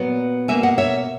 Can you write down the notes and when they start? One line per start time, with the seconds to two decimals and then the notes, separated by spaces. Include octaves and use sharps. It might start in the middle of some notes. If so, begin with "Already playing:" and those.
Already playing: A#2 F#3 B3
0.48 B2 A#3 E5 G#5
0.63 D#5 F#5
0.78 C#5 E5